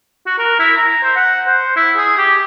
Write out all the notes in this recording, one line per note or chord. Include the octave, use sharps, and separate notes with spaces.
F#4
A#4
E4
A#5
C5
F#5
C5
E4
G#4
G4